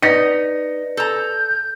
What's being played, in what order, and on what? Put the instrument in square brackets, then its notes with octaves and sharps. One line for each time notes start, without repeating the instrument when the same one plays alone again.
[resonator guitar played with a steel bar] D#4 [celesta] B4 D5 [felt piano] A#6 C#7
[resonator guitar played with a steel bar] A4 A#5 [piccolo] G6